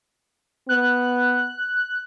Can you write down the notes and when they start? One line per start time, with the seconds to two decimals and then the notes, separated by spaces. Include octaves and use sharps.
0.69 B3 F#6